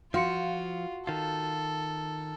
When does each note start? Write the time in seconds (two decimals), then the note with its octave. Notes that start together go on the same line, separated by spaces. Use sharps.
0.14 F3 F4 F#4 F5 C6 C#7
1.07 D#3 F4 A4